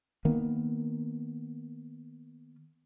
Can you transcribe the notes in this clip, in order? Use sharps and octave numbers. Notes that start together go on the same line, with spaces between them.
D#3 A#3 B3